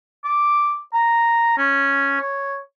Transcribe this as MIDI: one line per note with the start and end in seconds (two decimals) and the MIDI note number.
0.25 0.78 86
0.94 1.56 82
1.58 2.17 61
2.20 2.58 73